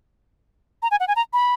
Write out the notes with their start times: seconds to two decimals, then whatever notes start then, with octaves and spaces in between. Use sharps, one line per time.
0.82 A#5
0.91 G#5
1.00 F#5
1.08 G#5
1.16 A#5
1.33 B5